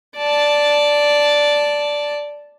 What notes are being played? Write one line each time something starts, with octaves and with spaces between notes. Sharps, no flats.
D5 A5